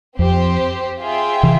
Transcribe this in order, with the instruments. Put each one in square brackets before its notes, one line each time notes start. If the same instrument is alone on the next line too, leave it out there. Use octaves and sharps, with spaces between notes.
[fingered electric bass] F2 [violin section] C4 G4 C5
[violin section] F4 G#4 E5 G5
[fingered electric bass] C3 E3